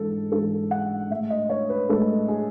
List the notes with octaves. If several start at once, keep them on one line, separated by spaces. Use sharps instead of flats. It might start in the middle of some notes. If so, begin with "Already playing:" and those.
Already playing: G#2 E3 G#3 A4
G#2 E3 G#3 A4
F#5
A2 G#3 E5
D#5
C#5
B4
A2 G#3 A4
G#4